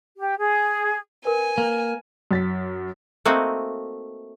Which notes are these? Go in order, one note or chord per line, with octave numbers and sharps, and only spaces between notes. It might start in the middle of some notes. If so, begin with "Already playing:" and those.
G4
G#4
A#4 B4 G#5
A#3
F#2 A6 B6
A3 A#3 C4 D#4 F#4